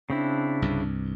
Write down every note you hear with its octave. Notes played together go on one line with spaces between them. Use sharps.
C#3 C4 D4 E4
C2 G2